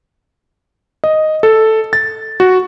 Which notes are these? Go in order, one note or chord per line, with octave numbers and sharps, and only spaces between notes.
D#5
A4
A6
F#4